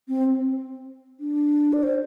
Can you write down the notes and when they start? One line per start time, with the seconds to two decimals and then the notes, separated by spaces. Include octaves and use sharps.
0.08 C4
1.20 D4
1.73 D5
1.83 C5